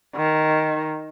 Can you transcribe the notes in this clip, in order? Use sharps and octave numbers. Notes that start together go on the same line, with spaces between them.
D#3